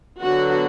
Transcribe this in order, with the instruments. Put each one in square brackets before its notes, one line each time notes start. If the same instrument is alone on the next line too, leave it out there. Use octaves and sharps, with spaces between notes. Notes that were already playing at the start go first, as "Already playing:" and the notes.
[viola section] D3 F#3 B3 F#4